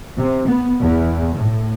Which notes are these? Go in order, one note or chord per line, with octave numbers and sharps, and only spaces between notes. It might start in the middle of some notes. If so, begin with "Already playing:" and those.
C3
B3
E2
A2